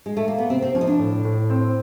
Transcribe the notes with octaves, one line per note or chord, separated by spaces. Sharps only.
G#3
A3
A#3
B3
C3 C4
C4
F3 C#4
D#4
D4
A2
A2
C4